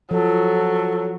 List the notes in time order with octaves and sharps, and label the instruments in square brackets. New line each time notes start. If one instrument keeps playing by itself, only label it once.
[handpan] F3 [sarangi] F#3 [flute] A4